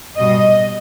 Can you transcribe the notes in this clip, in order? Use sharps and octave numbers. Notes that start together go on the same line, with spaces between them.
B2 G3 D#5